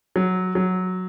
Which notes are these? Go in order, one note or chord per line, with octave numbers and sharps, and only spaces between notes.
F#3
F#3